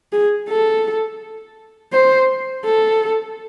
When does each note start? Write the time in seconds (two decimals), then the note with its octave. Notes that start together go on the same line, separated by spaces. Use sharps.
0.13 G#4
0.49 A4
1.93 C5
2.65 A4